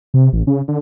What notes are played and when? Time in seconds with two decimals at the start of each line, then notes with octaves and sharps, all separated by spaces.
0.14 C3
0.33 A1
0.47 C#3
0.68 D3